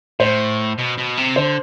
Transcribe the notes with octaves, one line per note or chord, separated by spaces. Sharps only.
A2 C5
B2
B2
C3
D3 C5